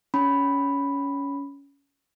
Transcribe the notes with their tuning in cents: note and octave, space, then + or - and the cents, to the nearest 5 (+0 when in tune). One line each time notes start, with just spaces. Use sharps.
C#4 +15 B5 +0